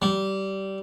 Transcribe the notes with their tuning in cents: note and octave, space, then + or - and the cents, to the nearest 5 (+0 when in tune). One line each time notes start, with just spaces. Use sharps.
G3 -20